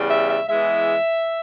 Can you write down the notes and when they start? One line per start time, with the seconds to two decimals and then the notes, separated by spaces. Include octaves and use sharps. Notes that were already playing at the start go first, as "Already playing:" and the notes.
Already playing: E2 C#3 G3
0.10 E5
0.29 E5
0.48 E2 E3 G#3 E5